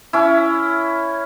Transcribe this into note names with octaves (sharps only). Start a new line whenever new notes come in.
C#4 E4